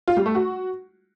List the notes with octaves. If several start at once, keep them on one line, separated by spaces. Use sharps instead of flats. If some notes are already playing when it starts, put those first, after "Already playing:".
F4
G3
A3
F#4